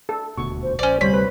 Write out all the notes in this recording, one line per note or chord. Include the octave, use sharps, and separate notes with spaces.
A4
D#1 D2 B2 C#6
C5
A#1 C#4 C5 D5
D2 C3 G3 C5 C#5 B5
B4